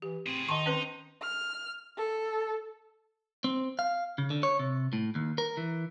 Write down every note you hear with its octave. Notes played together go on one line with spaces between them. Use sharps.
E3 G4
A2 C4 G#4
D#3 D#4 D#5 A5 C6 C#6
C4 C#4 B4 C5
F6
A4
C4
F5
C#3
D3
C#5
C3
A2
D#2
A#4
E3